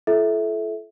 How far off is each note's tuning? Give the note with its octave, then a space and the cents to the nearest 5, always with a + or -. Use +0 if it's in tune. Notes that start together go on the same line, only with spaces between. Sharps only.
F4 -45 A4 -25 E5 -15